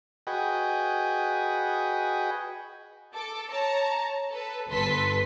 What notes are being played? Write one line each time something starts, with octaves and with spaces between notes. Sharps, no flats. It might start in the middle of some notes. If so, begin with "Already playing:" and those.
F#4 G#4 B4 D#5 G5
A4 D6
C#5 A5 A#5
A4 B4
G1 A4 B4 C6 B6